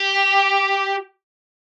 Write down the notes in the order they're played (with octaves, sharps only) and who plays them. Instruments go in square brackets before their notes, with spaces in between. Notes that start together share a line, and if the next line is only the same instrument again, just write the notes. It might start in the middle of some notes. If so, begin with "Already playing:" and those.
Already playing: [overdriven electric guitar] G4